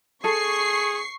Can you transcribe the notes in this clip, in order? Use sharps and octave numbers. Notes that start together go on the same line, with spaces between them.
G#4 A4 C#6 C7